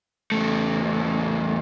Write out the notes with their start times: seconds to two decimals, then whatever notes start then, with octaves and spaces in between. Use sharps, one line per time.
0.32 E2 A3